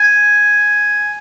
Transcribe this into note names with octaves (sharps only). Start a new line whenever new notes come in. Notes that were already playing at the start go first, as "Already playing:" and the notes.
Already playing: G#5